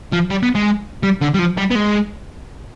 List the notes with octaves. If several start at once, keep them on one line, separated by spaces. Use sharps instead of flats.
F3
G3
B3
G#3
G3
D3
G3
F3
G3
B3
G#3